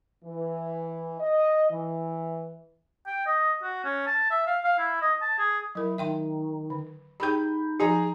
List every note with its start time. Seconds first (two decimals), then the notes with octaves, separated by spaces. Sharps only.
0.24 E3
1.19 D#5
1.70 E3
3.07 G5
3.26 D#5
3.63 F#4
3.85 C#4
4.07 A5
4.31 E5
4.47 F5
4.64 F5
4.79 E4
5.02 D#5
5.22 A5
5.39 G#4
5.75 F#3 E4 A#4
5.98 D#3 E5 G5 C6
6.70 D3
7.20 D#4 G4 G#4 G5 B5 G6
7.80 F3 D#4 G#4 A#5